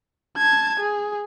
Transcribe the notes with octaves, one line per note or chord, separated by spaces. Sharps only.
A5 G#6
G#4